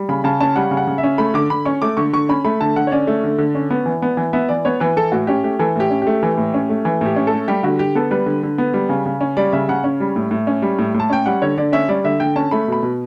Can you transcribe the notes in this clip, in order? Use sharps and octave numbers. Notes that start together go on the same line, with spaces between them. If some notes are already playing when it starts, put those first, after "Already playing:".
Already playing: G3
C#3 B5
C#3 A5
C#4 A5
G3 F#5
C#3
F#5
C#3
E5
C#4
A3 B5
D3 D6
D3 B5
C#4 C#6
A3 D6
D3 C#6
D3 C#6
C#4 B5
A3 B5
D3 A5
D3 F#5
C#5
C#4 D5
A3
D3
D3
C#4
B3
E3
B3
E3
B3 E5
E3 D5
B3 C#5
E3 B4
E3 A4
A2 F#4
C#4 G4
A3 G4
E3 A4
A2 G4
C#4
A3 G4
E3
A2
C#4
A3
E3
A2 G4
C#4
A4
A3
G3 G4
D3 F#4
D3 G4
B3 A4
G3 B4
D3
D3
B3
G3
C#3
C#3
C#4
G3 D5
C#3 E5
C#3 F#5
C#4
G3
A2
A2
C#4
G3
A2
A2
A5
C#4 G5
G3 F#5
D3 C#5
D3 D5
C#4 E5
G3 D5
D3 E5
D3 G5
C#4 A5
A3 B5
B2 B5
B2